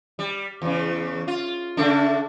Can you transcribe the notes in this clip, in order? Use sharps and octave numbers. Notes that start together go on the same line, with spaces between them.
G3
E2 C#3
F4
C#3 A3 D4